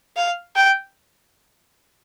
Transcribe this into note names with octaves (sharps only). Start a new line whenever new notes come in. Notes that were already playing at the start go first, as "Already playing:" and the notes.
F5
G5